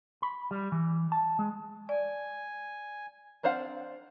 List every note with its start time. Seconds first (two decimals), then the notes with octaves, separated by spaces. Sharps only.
0.22 B5
0.51 G3
0.72 E3
1.12 A5
1.39 G#3
1.89 D5 G#5
3.43 C4 D4 C5 F5 F#5